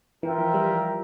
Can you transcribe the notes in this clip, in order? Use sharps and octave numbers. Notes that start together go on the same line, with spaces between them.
E3 F4 A#4 E5 G5
F3
G3